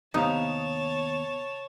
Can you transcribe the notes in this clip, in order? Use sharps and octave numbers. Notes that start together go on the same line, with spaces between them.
D#2 C3 B3 D#4 C#5 F5 A5